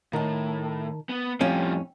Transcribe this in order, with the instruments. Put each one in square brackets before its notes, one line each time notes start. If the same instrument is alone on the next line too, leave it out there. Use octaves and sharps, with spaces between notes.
[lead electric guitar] A2 [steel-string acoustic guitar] D#3 A5
[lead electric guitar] B3
[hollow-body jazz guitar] F2 A2 C#4 [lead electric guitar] F3 G3 [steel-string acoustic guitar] C4